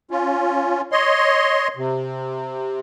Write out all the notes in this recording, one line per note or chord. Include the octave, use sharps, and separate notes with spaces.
C#4 F4
C#5 D#5 C6
C3